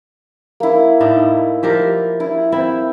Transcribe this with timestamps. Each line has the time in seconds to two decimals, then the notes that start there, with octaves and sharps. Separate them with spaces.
0.60 A#3 E4
1.00 A2 D4 D#4
1.63 F3 G4 A#4
2.20 E4
2.52 C4 E4